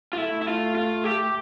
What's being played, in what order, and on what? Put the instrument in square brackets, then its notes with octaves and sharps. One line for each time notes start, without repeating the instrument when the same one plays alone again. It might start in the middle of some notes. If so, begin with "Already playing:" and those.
[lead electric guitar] F4
[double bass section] A3 [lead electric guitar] E4
[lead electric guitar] E4
F4
F4
G4